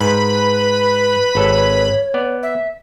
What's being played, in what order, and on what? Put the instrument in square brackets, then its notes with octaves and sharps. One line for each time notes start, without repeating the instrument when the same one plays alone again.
[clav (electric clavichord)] G#2 [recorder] B4 [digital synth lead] B5
[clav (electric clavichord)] G#1 A4 [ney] C#5
[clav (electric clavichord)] B3 D5
[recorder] E5